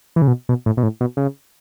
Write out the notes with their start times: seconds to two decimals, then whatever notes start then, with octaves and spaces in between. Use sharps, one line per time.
0.16 E3
0.22 C#3
0.27 B2
0.49 B2
0.66 A2
0.77 B2
0.83 A2
1.01 B2
1.17 C#3